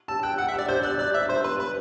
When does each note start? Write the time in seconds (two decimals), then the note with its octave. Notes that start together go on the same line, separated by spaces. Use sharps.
0.08 A5 E6
0.23 G5 F#6
0.38 F#5 F#6
0.49 E5
0.54 D5 E6
0.69 C5 G6
0.83 D5 F#6
0.99 D5 F#6
1.14 E5 E6
1.29 C5 C6
1.44 B4 C6
1.60 B4 B5